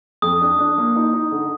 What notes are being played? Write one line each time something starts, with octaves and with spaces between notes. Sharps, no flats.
F2 D#6
D4
D4
A#3
D#4
D#4
D3